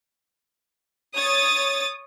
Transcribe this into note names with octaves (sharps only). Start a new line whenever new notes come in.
C#5 D#6 A6